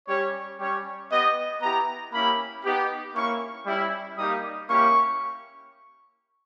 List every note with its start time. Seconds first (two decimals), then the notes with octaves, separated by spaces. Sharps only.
0.08 G3 C#4 G4 C#5
0.60 G3 C#4 G4 C#5
1.11 B3 G4 D#5
1.62 B3 E4 G4 A#5
2.13 A#3 C#4 E4 G4 B5
2.64 B3 D#4 G4
3.15 A#3 C#4 E4 C#6
3.66 G3 C#4 E4
4.17 G3 A#3 D#4 G4 D#6
4.69 A#3 C#4 E4 G4 C#6